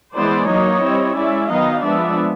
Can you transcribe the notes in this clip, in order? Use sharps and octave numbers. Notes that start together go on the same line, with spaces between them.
E3 G#3 B3 E4 C5 D5
F#3 A#3 D#4 C#5 D#5
G3 C4 E4
G#3 C#4 E4 D5 E5
D#3 F#3 B3 D#4 D#5 F5
F3 G#3 B3 D4 D5 E5